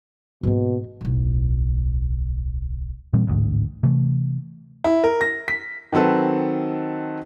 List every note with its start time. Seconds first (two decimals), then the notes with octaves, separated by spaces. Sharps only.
0.43 G#2 B2 A#3
1.01 D1 B1
3.13 A#2 E3 G3 C4
3.27 A1 D2 G#2
3.83 C3 E3 A3
4.84 E4
5.04 A#4
5.21 A#6
5.48 B6
5.92 D#3 F#3 C4 A4 B4